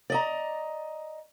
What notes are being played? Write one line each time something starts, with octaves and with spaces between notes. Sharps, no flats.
D5 D#5 A#5